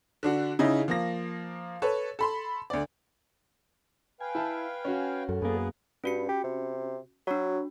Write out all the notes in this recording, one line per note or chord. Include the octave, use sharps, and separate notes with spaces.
D3 D4 F#4
C#3 D#4 E4 D#5
F3 A#3 A#6
A4 B4 C#5
A4 B5 C6
D2 D5
B4 F5 G5 G#5
E4 A5
C#4 F#4
F#2 A4
F#2 A#3 B3 G#4 B4
G2 C#4 F#4 C#7
G4
C3
F#3 D4 F#4